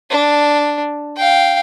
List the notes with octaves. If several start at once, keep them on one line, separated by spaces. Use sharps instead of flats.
D4
F5 G5